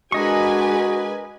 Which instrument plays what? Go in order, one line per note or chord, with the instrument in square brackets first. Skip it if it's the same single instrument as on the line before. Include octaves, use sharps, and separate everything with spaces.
[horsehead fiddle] G#3 D4 [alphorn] F#4 [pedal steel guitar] A#4 D#5 C#6 [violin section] B4 G#5